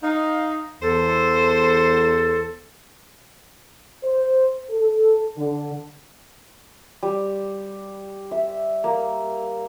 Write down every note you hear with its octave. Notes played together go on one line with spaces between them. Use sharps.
D#4 F5
E2 A4 C5
C5
A4
D3
G3
E5
A#3